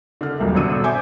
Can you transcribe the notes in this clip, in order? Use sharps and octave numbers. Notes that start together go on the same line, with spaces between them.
D3 F6
D#1 B1 G3 A#3 E5
G#1 B2 D3 E6 C#7 D#7
C5 E5 G#5 D6 G6 G#6